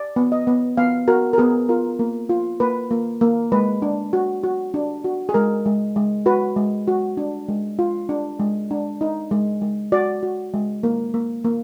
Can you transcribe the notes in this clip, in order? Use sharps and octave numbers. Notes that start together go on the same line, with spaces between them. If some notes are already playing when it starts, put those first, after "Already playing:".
Already playing: D5
B3
D#5
B3
B3 F5
F#4 A#4
A#4
B3 G#4
F4 A#4
A#3
F4
A#3 B4
A#3
A#3
G#3 B4
D4
F#4
F#4
D4
F#4
G#4
G#3 A#4
G#3
G#3
F#4 B4
G#3
F#4
D4
G#3
F4
D4
G#3
D4
D#4
G#3
G#3
F#4 D5
F#4
G#3
A#3
A#3
A#3